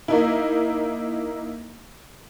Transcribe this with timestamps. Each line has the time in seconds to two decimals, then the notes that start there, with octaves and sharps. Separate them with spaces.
0.08 A#3 D#4 E4